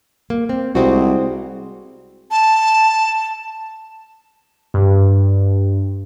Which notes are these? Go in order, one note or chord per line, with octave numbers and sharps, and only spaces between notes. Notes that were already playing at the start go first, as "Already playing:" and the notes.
A#3
C4
C2 G#3 C4 F#4
A5
G2